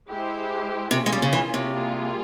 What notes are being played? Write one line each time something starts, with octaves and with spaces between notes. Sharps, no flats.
G#3 E4 G4 C5
C3 A#3 C#4 F4 G#4
G#3
G3
C#3
E3
C3
G3 A#3 F4 G#4